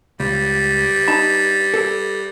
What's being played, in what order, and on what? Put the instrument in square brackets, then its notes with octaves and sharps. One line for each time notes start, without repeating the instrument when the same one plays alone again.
[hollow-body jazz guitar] C#2 [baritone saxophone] G3
[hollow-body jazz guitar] D#4 A5 B5
A4